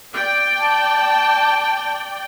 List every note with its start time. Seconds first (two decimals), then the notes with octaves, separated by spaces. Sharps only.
0.14 D5 G5
0.59 A5